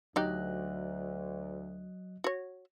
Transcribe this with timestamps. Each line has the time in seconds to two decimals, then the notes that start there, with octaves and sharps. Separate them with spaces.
0.16 D2 F#3 D#4 G4 D#5 F#6
2.24 F#4 C#5